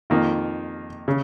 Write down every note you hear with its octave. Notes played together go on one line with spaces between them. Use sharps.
F2 D#3 A#3 F4
C#3